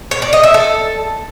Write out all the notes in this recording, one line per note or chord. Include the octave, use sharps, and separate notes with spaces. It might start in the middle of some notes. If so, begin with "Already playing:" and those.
C#5
D5
D#5
E5
A4